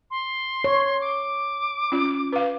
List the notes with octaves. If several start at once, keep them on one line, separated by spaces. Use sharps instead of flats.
C6
C#5
D6
C#4 F4
B4 F5